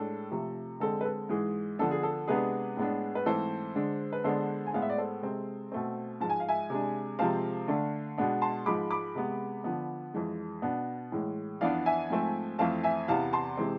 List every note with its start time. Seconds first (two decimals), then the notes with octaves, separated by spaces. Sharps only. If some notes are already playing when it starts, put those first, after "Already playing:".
Already playing: A2 G#3 D4 A4
0.31 C3 F3 A3
0.80 D3 G#3 C4 A4
1.01 B4
1.05 A4
1.29 G#2 E3 G#3 G#4
1.79 D3 F3 B3 D4 A4
1.91 G#4
2.03 A4
2.28 C3 G#3 B3 D4 G#4 B4
2.77 A2 G#3 B3 D4
3.15 B4
3.26 G#2 E3 A3 C4 A4 C5
3.75 D3 G#3 D4
4.13 B4
4.24 D3 G#3 B3 D4 A4 C5
4.66 G#5
4.74 A2 G#3 B3 F5
4.82 E5
4.90 D5
4.98 A4 C5
5.23 C3 G#3 C4
5.72 B2 A3 C4
6.20 G#2 F3 G#3 A5
6.30 G#5
6.40 F5
6.48 E5 G#5
6.70 C3 G#3 D4
7.19 C3 F3 G#3 C4 F5 A5
7.68 D3 A3 D4
8.18 B2 G#3 B3 D4
8.42 A5 C6
8.66 G#2 F3 G#3 B5 D6
8.91 B5 D6
9.15 C3 G#3 B3
9.64 D3 F3 B3
10.14 F2 E3 G#3
10.62 B2 B3 D4
11.12 A2 E3 G#3
11.61 F2 E3 B3 D4 D5 F5
11.86 E5 G#5
12.10 G#2 F3 A3 C4
12.59 F2 E3 A3 C4 F5 A5
12.84 E5 G#5
13.08 E2 C3 E3 B3 F5 A5
13.33 A5 C6
13.57 C3 E3 G#3 C4